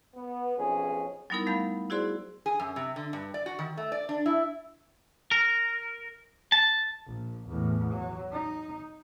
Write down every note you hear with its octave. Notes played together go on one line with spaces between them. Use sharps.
B3
B1 F2 C#4 G#4
F#3 G3 B3 D#4 E4 A#4
F#3 A3 F5 B5 G6
E4 F#4 G#4 C5 D5 C6
G#4
F#2
C3
D3
G2
D5
F#4
D#3
A3
D5
D4
E4
A#4
A5
A#1
E2 A2
F#3
D#4